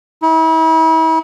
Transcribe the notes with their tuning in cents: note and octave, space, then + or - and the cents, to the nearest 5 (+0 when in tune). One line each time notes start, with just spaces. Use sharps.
E4 -40